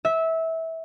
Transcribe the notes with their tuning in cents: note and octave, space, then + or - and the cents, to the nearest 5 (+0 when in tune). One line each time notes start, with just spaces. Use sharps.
E5 -20